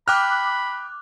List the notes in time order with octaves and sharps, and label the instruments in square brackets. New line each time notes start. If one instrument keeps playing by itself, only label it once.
[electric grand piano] G5 F6 [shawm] B5 [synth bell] D6 F#6